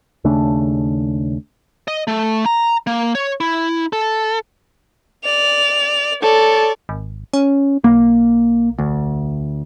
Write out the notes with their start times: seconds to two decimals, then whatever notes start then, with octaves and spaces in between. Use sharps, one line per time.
0.24 D#2 C#3 A3 D4
1.88 D#5
2.08 A3
2.46 A#5
2.87 A#3
3.15 C#5
3.40 E4
3.93 A4
5.24 D5 F7
6.23 A4 C#5 D5
6.89 G#1
7.33 C#4
7.84 B1 A#3
8.79 D2